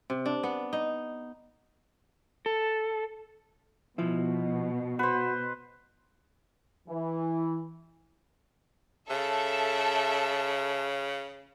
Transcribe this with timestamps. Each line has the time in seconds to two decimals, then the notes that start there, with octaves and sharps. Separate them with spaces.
0.10 C3
0.26 D4
0.43 B3
0.73 D#4
2.46 A4
3.98 B2 F3 E4
4.99 F#4 B4 C5
6.88 E3
9.10 C#3 A4 E5